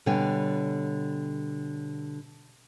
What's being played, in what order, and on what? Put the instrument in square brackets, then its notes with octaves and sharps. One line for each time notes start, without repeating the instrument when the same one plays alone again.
[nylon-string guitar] B2 D3 G3 C#5 G5 G#5